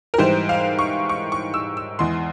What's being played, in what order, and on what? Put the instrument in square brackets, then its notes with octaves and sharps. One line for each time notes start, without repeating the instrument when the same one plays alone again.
[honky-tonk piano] A#4
G#2 E3 G3 C5
F5
C#6
C#6
C#6
E6
E6
E2 E3 G#3 C6